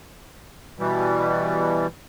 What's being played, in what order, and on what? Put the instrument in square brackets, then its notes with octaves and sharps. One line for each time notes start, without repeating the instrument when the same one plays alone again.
[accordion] B2 E3 G3